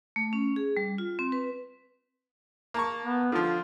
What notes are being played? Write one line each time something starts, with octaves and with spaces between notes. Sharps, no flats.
A3
C#4
G#4
G3
F4
C4
B4
A#3 A5 C#6
B3
D3 F3 F4